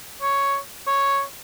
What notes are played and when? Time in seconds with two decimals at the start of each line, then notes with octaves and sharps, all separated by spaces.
0.22 C#5
0.87 C#5